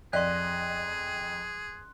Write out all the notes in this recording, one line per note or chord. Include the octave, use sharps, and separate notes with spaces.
F2 G#4 D5 D#5 F5 C6 F#6